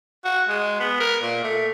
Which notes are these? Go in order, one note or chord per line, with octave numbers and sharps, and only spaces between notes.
F#4
G#3
B3
A#4
A#2
A3